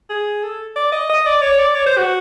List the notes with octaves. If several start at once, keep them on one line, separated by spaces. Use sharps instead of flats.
G#4
A4
D5
D#5
D#5
D5
C#5
D5
C#5
C5
F#4